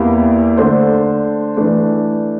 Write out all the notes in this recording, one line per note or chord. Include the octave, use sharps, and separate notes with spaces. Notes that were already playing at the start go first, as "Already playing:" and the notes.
Already playing: E2 E3 A#3 E4 G4
D3 A3 D4 A4 C5
E3 A3 D4